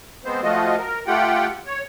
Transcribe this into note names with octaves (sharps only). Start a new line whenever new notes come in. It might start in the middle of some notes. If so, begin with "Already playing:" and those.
G#3 B3 C4 C5
F3 A3 F4 F#4 D#5
A#4
A3 F4 G4 F#5 G5
C#5